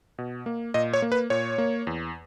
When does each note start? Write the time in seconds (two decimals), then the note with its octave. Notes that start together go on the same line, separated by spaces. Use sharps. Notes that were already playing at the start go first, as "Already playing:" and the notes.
0.18 B2
0.46 A#3
0.74 A#2 D#5
0.93 C#5
1.02 A#3
1.12 B4
1.30 A#2 C#5
1.58 A#3
1.87 E2